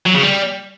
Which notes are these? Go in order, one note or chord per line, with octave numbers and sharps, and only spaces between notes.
F#3
C#3
G3